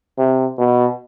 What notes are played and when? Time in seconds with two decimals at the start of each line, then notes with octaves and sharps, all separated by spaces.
0.18 C3
0.59 B2